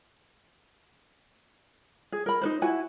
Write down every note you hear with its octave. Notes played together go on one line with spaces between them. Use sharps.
G#4
A#4 B5
D#4 B4 C5
E4 F#4 G#5